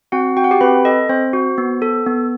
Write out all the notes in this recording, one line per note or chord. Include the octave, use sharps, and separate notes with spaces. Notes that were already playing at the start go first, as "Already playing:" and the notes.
C4 F#4 F#5
F#4 G5
F#5
G4 G5
C4 B4 B5
A4 D#5
C4 C5
F#4
B3
A4
B3